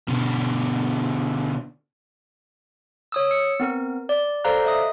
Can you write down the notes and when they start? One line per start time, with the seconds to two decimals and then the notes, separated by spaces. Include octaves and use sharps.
0.08 B2 D3
3.12 C#5 D#6 E6
3.31 E6 C#7
3.60 B3 C4 A#4
4.09 D5
4.44 A4 C5 D5 F5 A#5 F#6
4.65 D#5 E5 D#6